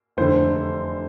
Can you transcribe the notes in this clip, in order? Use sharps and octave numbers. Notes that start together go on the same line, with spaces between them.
F1 E2 D3 C5